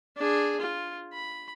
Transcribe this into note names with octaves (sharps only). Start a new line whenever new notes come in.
D4 G#4
F4
B5